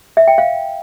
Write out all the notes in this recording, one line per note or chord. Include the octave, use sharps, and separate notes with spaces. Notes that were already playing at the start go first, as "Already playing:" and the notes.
E5
G5
F5